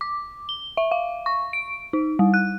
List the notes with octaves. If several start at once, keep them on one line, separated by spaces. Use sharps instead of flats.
D6
G7
E5
F5
C#6
D7
D#4
G3
F#6